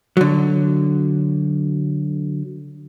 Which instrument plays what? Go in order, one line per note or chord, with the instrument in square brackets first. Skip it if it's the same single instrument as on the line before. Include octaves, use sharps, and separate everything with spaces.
[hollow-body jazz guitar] D3 F#3